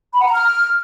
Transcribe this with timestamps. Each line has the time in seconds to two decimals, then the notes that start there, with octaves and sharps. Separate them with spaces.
0.13 B5
0.20 F#5
0.27 A#5
0.33 F6